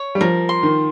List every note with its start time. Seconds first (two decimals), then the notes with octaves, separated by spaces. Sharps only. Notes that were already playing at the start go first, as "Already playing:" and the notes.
Already playing: C#5
0.15 G3
0.21 F3 A#4
0.49 C6
0.63 D#3